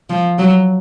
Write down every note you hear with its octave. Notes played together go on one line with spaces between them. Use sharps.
F3
F#3